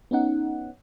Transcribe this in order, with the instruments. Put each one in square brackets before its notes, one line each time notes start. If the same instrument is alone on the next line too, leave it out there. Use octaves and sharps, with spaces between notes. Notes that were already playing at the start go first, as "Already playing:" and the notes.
[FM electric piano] B3 C#4 D#4 F#5